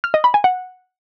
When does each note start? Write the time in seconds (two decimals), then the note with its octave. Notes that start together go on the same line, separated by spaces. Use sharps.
0.04 F6
0.14 D#5
0.24 B5
0.34 G#5
0.44 F#5